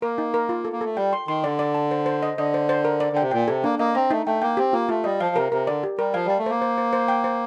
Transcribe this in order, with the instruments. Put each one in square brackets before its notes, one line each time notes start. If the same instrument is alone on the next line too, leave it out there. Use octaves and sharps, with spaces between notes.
[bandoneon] A#3 [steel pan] A#4
[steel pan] D#4
A#4
F4
A4
[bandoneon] A#3
[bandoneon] A3 [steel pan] A4
[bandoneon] G3 [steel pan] G5
[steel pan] C6
[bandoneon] D#3 [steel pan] C6
[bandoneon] D3 [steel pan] D5
[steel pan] D5
A5
C5
C5
D#5
[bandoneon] D3 [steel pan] D#5
[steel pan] C5
C5
A#4
D5
[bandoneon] D3 [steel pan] G5
[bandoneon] C3
[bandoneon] A#2 [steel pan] G5
[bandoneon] C3 [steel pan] A4
[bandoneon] A#3 [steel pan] D4
[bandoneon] A#3 [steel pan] D#5
[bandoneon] C4 [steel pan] A#5
[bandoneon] A3 [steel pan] D#4
[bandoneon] A3 [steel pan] G5
[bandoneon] A#3 [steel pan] G5
[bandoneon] C4 [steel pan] G4
[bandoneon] A#3 [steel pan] F4
[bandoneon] A3 [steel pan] F4
[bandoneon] G3 [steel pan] D#5
[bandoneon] F3 [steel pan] F5
[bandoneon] C3 [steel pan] A#4
[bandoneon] C3 [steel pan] A#4
[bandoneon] D3 [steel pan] D5
[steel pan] G4
[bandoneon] G3 [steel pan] A#4
[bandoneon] F3 [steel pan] F5
[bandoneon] G3 [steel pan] A5
[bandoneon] A3
[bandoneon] A#3 [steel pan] C5
[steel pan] C5
C5
C5
G5
C5